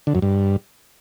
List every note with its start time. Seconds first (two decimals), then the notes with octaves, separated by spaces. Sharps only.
0.07 D3
0.15 F#2
0.22 G2